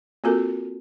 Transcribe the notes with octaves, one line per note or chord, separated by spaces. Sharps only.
A#3 C4 F4 F#4 A4 A#4